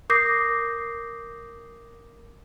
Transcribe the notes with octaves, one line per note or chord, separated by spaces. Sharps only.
A#4 D6 D#6 G6 A#6 C7